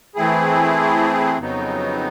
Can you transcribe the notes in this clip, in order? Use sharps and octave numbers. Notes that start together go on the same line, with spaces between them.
E3 A3 C4 E4 G#4
F2 C#3 F#3 B3 D#4